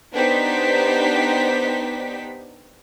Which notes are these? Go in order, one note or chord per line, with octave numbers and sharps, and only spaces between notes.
B3 D4 D#4 G4 C5 B6